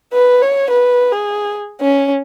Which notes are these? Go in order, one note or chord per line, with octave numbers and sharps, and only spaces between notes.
B4
C#5
B4
G#4
C#4